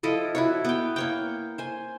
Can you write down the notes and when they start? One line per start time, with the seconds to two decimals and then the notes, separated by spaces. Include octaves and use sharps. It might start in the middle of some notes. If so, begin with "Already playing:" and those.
0.03 F3 E4 A4 D#5
0.35 E4 F#4 C#5
0.65 B3 G5
0.96 A#3 C#5 G5
1.58 C5 G#5